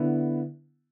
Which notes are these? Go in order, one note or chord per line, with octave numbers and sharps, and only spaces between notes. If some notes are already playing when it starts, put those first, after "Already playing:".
Already playing: D3 B3 E4